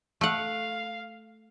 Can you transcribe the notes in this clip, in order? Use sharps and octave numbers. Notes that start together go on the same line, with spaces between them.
A3 F5 F#5